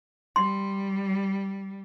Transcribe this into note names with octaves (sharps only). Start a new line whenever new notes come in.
G3 C6